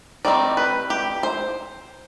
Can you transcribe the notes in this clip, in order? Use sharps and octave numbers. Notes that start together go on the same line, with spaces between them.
D#3 G3 C4 D#4 D5
B4
G4
C5